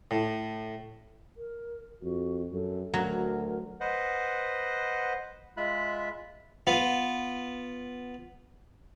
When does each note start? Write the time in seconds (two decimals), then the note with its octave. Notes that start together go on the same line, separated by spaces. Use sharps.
0.11 A2
1.37 A#4
2.02 F2 F#4
2.52 F#2 A4
2.94 D2 F#3 A#4
3.81 B4 C5 D#5 F#5
5.57 G#3 F4 E5 B5 F#6
6.67 B3 F4